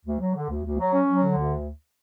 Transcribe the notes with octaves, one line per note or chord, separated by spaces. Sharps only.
D2
F#3
D3
D2
D2
F#3
C#4
F#3
D3
D2